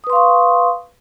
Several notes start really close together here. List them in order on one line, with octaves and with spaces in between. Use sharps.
D#6 B4 C6 F5 C#6